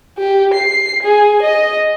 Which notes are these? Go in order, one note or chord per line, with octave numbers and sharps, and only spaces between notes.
G4
C7
G#4
D#5